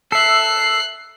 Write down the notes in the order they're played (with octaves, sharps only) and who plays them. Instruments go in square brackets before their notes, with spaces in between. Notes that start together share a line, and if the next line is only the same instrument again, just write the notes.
[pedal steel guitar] A4 E5 [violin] F#6 C7